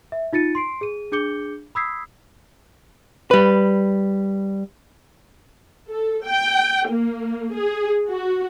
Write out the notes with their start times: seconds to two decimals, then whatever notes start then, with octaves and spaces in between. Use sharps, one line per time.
0.12 E5
0.33 D#4 F4 A6 C#7 D#7
0.55 C6 C7 D7
0.81 G#4 D#7
1.12 D4 G#4 D6 G6 C#7 G7
1.75 B5 D#6 E6 G#6 B6 C7
3.31 G3 B4
5.90 A4
6.25 G5
6.90 A#3
7.56 G#4
8.08 F#4